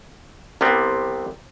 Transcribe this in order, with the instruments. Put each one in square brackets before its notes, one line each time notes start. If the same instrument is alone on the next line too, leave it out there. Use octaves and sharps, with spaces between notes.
[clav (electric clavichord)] C2 C3 G3 B3 C4